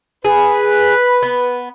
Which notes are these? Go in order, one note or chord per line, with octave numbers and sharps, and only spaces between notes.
G#4 B4
B3